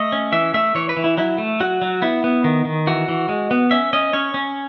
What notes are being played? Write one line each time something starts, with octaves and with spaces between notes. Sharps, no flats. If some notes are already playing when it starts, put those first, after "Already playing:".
Already playing: A3 D#5
C#4
E3 E5
A3 E5
E3 C#5
B4
E3
E4
F#3 E4
A3
F#3 F#4
F#3
B3 E4
B3
D#3
D#3
E3 F#4
E3
G#3
B3
C#4 E5
C#4 D#5
C#4 C#5
C#4